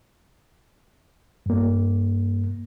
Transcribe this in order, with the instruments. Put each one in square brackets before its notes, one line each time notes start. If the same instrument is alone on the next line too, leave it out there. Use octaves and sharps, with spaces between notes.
[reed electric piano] G2 A#3